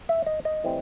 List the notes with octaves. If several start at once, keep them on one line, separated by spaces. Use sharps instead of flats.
E5
D#5
D#5
A2 E3 G3 C4